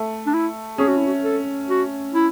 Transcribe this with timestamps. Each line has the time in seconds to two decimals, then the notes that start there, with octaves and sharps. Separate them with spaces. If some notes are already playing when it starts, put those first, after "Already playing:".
Already playing: A3
0.26 D4
0.33 E4
0.78 C#4 G#4
0.88 F#4
0.97 E4
1.07 F#4
1.24 A4
1.69 F#4
2.14 E4